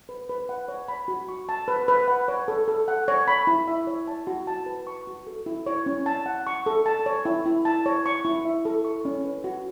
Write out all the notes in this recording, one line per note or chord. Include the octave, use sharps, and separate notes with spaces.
B4
B4
F#5
C#5
B5
F#4
C#6
A5
B4
B4
F#5
C#5
A4
A4
F#5
C#5
B5
E4
E5
C#5
A5
F#4
A5
B4
C#6
F#4
A4
E4
C#5
C#4
A5
F#5
C#6
A4
A5
C#5
E4
E4
A5
C#5
C#6
E4
E5
A4
C#6
C#4
B4
F#4